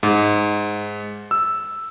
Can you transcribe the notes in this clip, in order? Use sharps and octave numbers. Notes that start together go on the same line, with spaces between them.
G#2
E6